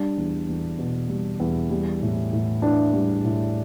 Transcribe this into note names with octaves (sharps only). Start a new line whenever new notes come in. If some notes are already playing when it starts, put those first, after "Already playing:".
Already playing: G3 D4
E2
E2
B2
G3
E2
G3
A2
A2
E3 D4
G3
A2